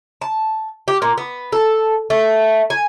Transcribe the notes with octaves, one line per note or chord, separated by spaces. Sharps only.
A5
G4
A#2
B3
A4
A3
G#5